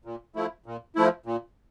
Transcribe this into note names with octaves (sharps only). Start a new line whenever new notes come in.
A#2
F3 A3 E4
A#2
F3 A3 E4
A#2